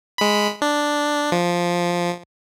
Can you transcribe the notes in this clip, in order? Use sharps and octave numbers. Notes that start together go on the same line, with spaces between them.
G#3 B5
D4
F3